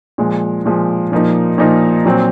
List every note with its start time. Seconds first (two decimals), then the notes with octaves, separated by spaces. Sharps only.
0.18 A#2 F3 G#3
0.66 A#2 F3 G#3
1.12 A#2 F3 A#3 D#4
1.58 A#2 F3 A#3 D#4
2.05 A#2 F#3 C4